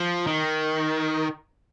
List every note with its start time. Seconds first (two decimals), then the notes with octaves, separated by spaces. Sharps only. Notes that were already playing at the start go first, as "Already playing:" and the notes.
Already playing: F3
0.27 D#3